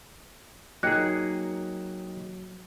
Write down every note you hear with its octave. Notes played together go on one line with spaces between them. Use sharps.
F#3 A#3 D#4 G#4 G5 F#6 C#7